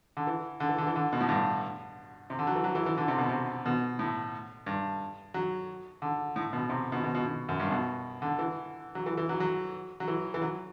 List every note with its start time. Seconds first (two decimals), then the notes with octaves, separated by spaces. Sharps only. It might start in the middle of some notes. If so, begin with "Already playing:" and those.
0.17 D3
0.27 E3
0.60 D3
0.69 E3
0.78 D3
0.87 E3
0.96 D3
1.13 B2
1.20 A2
1.29 G2
2.30 C3
2.39 D3
2.47 F#3
2.56 E3
2.64 F#3
2.75 E3
2.86 E3
2.98 D3
3.08 C3
3.18 B2
3.29 C3
3.66 B2
3.99 A2
4.66 G2
5.34 F#3
6.02 D3
6.36 A2
6.53 B2
6.69 C3
6.92 B2
7.04 B2
7.15 B2
7.26 B2
7.49 F#2
7.60 G2
7.71 B2
8.22 D3
8.39 E3
8.95 F#3
9.06 E3
9.17 E3
9.29 F#3
9.40 F#3
10.00 F#3
10.08 E3
10.34 E3
10.42 F#3